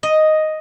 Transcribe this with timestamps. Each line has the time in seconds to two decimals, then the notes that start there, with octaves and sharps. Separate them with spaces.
0.03 D#5